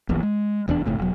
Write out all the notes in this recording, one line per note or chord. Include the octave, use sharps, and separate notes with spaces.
D#1 A#1 E2
G#3
F1 E2 G2 D4
G#1 A2 C3
E1 F#3